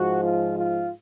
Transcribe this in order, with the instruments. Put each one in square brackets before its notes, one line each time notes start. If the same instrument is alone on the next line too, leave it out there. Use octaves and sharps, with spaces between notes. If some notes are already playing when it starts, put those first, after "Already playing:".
Already playing: [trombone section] G#2 F3 G#3 F#4
F4
F4